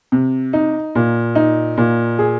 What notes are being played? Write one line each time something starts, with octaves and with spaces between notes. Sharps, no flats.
C3
D#4
A#2
D#4
A#2
G#4